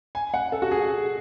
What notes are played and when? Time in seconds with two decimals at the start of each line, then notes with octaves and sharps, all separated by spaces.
0.15 G#5
0.34 F#5
0.52 A4
0.62 F#4
0.71 G#4